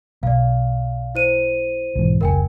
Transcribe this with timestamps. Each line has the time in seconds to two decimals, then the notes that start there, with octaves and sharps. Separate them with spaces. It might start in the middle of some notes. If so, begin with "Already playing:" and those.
0.23 B1 D5 F5
1.15 E4 C5 D#7
1.95 B1 G#2 E3
2.21 F1 C#2 A#4 G5 G#5